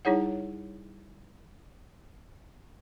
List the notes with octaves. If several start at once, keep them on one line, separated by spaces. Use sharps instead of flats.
G3 D#4 E4 G#4 C#5 F#5